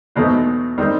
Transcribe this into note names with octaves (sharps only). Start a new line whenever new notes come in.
E2 B2 F#3 A3 D#4 C5
D#3 G3 C4 D#4